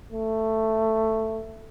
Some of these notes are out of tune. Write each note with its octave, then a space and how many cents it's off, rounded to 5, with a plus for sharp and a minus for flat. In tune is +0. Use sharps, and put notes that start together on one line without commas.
A3 +10